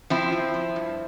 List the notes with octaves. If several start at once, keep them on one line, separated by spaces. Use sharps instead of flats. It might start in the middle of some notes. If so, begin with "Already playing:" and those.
F3 C4 E4
F3
F3
G2